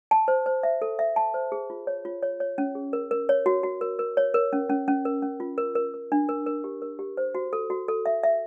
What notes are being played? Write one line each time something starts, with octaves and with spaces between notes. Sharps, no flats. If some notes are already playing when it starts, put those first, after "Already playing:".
A5
C5
C5
E5
A4
E5
A5
C5
G#4
F4
C#5
F4
C#5
C#5
C#4
G#4
A#4
A#4
C#5
F#4
F#4
A#4
A#4
C#5
A#4
C#4
C#4
C#4
A#4
C#4
F4
A#4
A#4
A#4
D4
A#4
A#4
G4
A#4
G4
C5
F#4
A4
F#4
A4
E5
E5